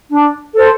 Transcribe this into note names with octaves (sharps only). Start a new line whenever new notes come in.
D4
A4 C5